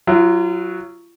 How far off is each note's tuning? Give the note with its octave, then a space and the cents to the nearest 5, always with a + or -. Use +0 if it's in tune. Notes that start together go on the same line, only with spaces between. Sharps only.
F#3 +0 F4 -40